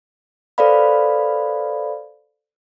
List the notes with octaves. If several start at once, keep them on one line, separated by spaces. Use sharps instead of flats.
A4 B4 C5 D5 F5 B5